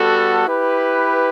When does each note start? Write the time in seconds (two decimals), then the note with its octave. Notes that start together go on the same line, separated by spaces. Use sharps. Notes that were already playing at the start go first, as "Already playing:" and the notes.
Already playing: G3 B3 F#4 A4
0.47 E4 G4 B4